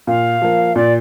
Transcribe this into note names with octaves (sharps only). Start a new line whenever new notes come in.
A#2 F5
F3 A#3
A#2 D5